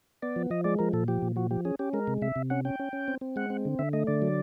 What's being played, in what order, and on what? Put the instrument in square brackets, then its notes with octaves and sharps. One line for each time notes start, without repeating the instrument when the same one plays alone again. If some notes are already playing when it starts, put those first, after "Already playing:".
[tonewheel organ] B3 D5
F3
F3 D#5
G#3 D5
F3 A#4
A#2 A4
F3 G4
A#2
F3 F#4
F3 G4
C#4 G#4
C#4 G4
G#3 A#4
C3
C3 E5
C3
C#4 F#5
C#4 G5
C#4
C#4
C4
C4
G#3 F#5
C4
D3
D3 E5
A3 D#5
D3 D5
F#3